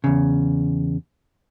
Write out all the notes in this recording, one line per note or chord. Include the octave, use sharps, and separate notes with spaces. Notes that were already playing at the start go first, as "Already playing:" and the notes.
E2 C#3